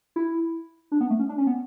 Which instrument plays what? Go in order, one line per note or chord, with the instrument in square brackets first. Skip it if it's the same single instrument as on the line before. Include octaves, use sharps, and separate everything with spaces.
[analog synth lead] E4
D4
B3
A3
C#4
D4
C#4
B3